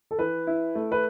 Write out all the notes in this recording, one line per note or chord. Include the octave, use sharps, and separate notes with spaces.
A4
E3 B4
E4
A3
B4